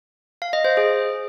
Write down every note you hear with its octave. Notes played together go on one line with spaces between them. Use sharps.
F5
D#5
C5
G#4